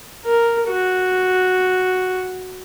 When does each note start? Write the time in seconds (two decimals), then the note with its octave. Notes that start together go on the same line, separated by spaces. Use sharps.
0.25 A#4
0.68 F#4